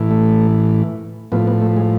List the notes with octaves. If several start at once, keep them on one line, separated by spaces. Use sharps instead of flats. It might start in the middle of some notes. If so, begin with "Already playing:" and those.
Already playing: A2 E3
A3
A2 F3 B3
B3
A3
G#3